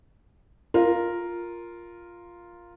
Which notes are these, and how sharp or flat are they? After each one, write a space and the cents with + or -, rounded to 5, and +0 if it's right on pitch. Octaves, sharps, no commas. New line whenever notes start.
F4 +0 A#4 +0